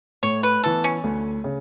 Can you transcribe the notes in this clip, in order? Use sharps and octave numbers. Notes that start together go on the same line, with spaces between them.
A2 C#5
B4
E3 B3 A4
C#4
D2
C#3